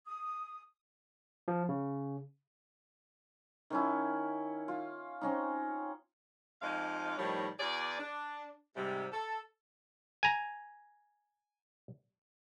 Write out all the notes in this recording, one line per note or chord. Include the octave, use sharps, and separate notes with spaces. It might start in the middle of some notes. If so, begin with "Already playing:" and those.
D#6
F3
C#3
D#3 C#4 E4
F4
C4 C#4 D#4
F2 G#3 D#4 F4 D5 F5
A2 D#3 F3 G3 D#4 C#5
E2 F#4 G#4 D5
D4
G#2 C3 G3
A4
G#5 A#5